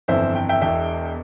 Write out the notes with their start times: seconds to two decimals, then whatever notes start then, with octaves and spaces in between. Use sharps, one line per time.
0.08 G1 F2 E3 C5 E5
0.35 G5
0.49 E5 G5
0.61 E1 E2 B2 E5 G5